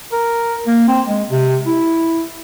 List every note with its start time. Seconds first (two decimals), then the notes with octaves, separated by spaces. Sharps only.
0.12 A#4
0.67 A#3
0.88 C4
1.07 G#3
1.30 C3
1.67 E4